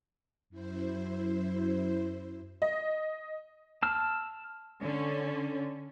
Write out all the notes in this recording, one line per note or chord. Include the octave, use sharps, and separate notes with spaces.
F#2 E4 C5
D#5
A5 E6 F6
D3 C#4